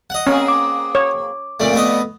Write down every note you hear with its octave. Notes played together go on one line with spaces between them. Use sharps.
D#5 F#5
A#3 C4 C#4 G#4
D6
C#5
F2 A#2 A3 D5
A3 B3 D#5